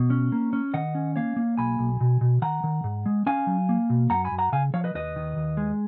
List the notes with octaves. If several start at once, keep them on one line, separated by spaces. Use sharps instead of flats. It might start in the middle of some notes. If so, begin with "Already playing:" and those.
Already playing: B2
C#4
A#3
C#4
D#3 D#5 F#5
C#4
A#3 C#5 F5
A#3
B1 G#5 B5
B1
B2
B2
D#3 F#5 A#5
D#3
G#2
G#3
C#4 F5 G#5
F#3
A#3
B2
F#2 F#5 A#5
G#5 B5
F#2
F#5 A#5
C#3 F5 G#5
F3 C#5 F5
B4 D#5
D#2 B4 D#5
D#3
D#2
G#3